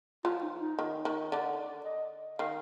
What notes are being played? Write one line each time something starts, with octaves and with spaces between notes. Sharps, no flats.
F3 F4
D#4
D#4
D#3
D#3
D3 D5
D5
D#5
D#3 F5